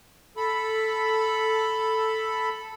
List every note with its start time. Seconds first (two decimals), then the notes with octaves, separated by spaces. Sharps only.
0.37 A4 B5